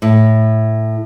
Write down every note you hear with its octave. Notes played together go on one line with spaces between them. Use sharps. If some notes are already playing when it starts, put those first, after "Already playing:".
A2